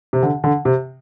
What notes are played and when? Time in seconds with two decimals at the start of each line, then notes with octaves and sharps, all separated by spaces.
0.13 C3
0.23 D3
0.44 D3
0.65 C3